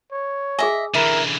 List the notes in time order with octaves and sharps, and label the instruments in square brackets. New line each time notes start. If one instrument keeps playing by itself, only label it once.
[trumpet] C#5
[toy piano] G#4 G#5 [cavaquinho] D#5 E5
[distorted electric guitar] D3 E3 [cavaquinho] E4 [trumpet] A#4